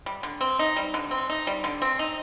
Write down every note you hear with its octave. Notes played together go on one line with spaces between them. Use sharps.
G3
D3
C4
D#4
G3
D3
C4
D#4
G3
D3
C4
D#4